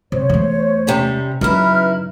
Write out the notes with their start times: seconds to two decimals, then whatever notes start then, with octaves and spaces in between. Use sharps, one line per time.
0.12 C3 C5 C#5
0.30 E2 A3
0.87 C3 G3 C#4
1.41 F#2 C#3 D#4 E4 B4 F6